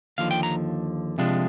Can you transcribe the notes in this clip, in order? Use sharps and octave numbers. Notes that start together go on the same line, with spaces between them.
D#2 D3 F3 F5
G5
A#5
C3 F3 G#3 D4